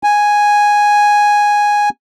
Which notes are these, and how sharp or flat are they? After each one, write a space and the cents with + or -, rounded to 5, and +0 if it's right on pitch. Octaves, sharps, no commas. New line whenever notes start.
G#5 -5